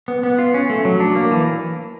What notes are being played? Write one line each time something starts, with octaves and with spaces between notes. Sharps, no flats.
B3
B3
F4
C#4
A3
F#3
D4
A#3
E3